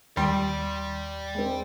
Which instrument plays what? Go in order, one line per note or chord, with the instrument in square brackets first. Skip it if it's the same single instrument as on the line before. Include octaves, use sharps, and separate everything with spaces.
[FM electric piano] D#2 [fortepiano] G3 [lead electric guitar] D5 G5 [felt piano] C6 D7
[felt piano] G#3 C4